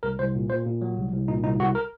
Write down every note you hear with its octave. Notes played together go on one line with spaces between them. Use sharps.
C2 A#4
C2 C5
A#2
A#2 C5
A#2
F#3
C2
C2
A#2 D#4
C2 D#4
C2 F#4
A#4